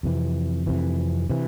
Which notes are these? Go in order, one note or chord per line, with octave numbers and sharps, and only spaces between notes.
F2 C3 E3
F2 C3 E3
C3 E3